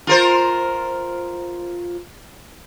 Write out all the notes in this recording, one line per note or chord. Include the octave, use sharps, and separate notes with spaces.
F4 A#4 C5